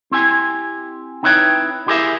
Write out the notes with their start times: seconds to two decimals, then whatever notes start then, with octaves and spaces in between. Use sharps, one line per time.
0.11 C4 E4 G4 G#5
1.23 C4 D#4 E4 B4 C#5 G5
1.87 E4 G4 G#4 A#4 E5 F5